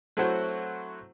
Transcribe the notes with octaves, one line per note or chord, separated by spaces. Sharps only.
F#3 A3 C4 E4 F#4 C5